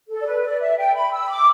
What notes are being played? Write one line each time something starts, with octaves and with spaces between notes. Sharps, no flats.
A4
D5
B4
D5
E5
G5
B5
E6
B5
D6